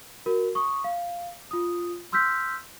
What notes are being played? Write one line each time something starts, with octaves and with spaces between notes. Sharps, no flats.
F#4 A#4
C#6 D#6
F5
F4 D#6
C6 E6 F6 G6 B6